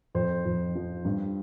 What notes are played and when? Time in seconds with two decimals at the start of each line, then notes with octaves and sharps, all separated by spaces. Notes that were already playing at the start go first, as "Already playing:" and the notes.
0.15 F2 C5
0.45 F2
0.75 F3
1.05 G2